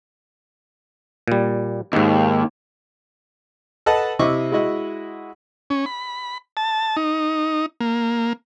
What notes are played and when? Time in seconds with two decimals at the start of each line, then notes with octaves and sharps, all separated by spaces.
1.28 A#2 G3
1.93 D#2 G#2 D#3
3.86 A4 B4 D#5 F#5 A5
4.19 C3 E4 D#5 C#6 D6
4.52 G#3 E4 F#4 D#5 F#5
5.70 C#4
5.86 B5
6.57 A5
6.97 D#4
7.81 A#3